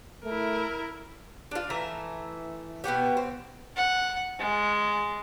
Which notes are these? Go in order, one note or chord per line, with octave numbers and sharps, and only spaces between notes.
A3 E4 A#4
D4 F4
E3 A3 E5 A#5
B2 B3 F#4 G4
C4
F#5
G#3